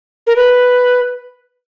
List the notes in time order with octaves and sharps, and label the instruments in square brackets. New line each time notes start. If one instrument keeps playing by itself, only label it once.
[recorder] A#4
B4